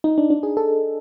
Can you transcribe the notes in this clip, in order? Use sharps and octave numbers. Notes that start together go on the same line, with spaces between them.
D#4
D4
D4
G#4
A4